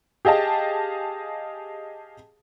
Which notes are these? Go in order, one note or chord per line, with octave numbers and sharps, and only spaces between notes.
G4 G#4 D#5 F5 A5